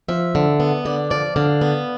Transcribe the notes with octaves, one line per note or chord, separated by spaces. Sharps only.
F3 E5
D3
B3
D3 D5
F3 D5
D3 F5
B3